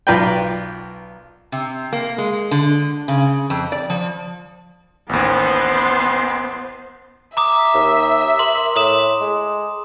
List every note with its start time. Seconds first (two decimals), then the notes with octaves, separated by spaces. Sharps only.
0.07 B1 F4 A#4 B4 D5 G5
1.52 C3
1.93 A#3
2.18 G#3
2.51 D3
3.08 C#3
3.50 F2
3.72 D5
3.90 F3
5.09 A1 D#2 B3 C5
7.37 E5 A#5 D6 D#6
7.74 D#2
8.39 A#4 C6
8.76 A2 C6 D#6 E7
9.21 G#3